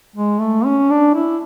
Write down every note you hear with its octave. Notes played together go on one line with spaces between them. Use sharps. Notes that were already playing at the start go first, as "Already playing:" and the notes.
G#3
A3
C#4
D4
E4